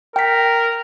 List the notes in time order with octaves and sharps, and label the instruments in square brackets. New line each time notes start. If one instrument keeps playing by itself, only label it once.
[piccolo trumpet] A#4 [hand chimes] G5 B6